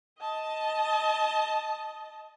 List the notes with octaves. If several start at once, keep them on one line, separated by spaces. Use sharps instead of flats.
D#5 A5